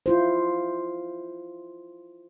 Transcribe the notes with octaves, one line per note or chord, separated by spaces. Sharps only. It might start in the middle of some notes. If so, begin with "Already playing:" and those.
E4 F4 C5